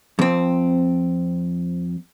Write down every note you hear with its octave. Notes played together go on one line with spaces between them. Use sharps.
F2 C4